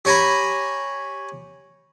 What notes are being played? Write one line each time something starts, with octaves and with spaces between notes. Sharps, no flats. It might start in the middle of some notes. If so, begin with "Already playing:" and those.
G4 C#5 G#5 A#5 B5